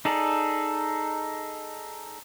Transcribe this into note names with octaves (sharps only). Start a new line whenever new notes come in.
D#4 G#4 A4 D5